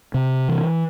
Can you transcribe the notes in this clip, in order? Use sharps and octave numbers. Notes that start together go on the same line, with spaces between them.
C3
E3